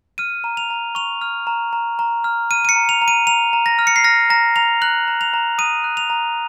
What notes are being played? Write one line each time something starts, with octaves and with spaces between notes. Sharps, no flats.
F6 D#7
A#5
F7
A#5
C#6 F7
F6
A#5
A#5
A#5
F6
F6 D#7
D#7
C#7
A#5
F7
A#5
D#7
A#5 F7
A#5
A#6
F6
C#7
C7
F6 A#6
A#5 A#6
A#5 F7
F#6 F#7
A#5
F7
A#5
D#6 D#7
F#6
F7
A#5